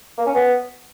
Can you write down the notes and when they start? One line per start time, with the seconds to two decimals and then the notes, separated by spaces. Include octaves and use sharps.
0.17 A#3
0.26 C#4
0.35 B3